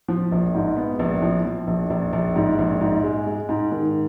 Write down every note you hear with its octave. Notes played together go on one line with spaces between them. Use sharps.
F3
A#1
G#2
B3
A#1
F3
F3
A#1
A#1
A#1
G#2
A#1
G#2
G#3
G#3
G#2
D#3